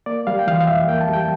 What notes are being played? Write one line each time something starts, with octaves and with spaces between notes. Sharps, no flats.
A#3 D5
G3 F5
G5
E3 F5
F5
F2 E5
A#3 G5
A5
G3 G5